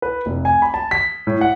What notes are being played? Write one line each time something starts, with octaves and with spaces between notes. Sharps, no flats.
B4
F1
G#5
B5
A5
B6
A2
F#5